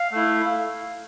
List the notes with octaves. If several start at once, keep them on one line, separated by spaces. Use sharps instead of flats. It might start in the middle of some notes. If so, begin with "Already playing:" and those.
Already playing: F5
A3 E4